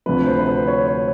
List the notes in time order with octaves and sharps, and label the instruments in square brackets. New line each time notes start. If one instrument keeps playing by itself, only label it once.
[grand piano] D2 C3 F3 B4
C5
B4
C5
C#5
C#5